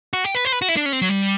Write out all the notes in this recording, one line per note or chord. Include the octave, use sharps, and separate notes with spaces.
F#4
G4
B4
C5
B4
F#4
E4
D4
C#4
C4
F#3
G3